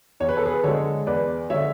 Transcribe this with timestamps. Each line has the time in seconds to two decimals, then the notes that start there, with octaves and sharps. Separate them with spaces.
0.20 E2 C#5
0.29 B4
0.37 A4
0.45 G#4 B4
0.63 D3 G#3 A4 C#5
1.07 E2 B4 D5
1.50 D3 G#3 C#5 E5